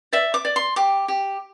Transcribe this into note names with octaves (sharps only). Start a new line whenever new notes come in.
D5 E5
D6
D5
C6
G4 D6
G4